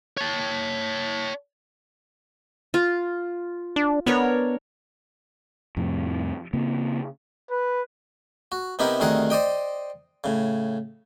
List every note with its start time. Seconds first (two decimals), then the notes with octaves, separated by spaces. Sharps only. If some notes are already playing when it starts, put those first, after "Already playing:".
0.17 C#5 A5
2.74 F4
3.76 D4
4.06 B3 D4 A#4 C#5
5.77 F2 A2 C3
6.53 C#3 A#3 C4
7.51 B4
8.52 F#4
8.79 C3 B3 D#4 E4 G4 A#4
9.00 D2 C3 D#3 G#4 A#4 F#5
9.30 C5 D5 D#5 G5
10.24 A2 C#3